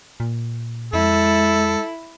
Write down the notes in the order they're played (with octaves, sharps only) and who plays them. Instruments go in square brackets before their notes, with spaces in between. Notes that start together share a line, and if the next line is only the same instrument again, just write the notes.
[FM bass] A#2
[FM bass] F2 [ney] G#3 [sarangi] E4 [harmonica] A4